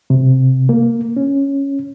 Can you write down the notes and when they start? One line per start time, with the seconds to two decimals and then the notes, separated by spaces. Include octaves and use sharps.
0.10 C3
0.69 A#3
1.16 C#4